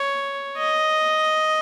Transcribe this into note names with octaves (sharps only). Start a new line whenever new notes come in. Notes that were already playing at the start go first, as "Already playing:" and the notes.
Already playing: C#5
D#5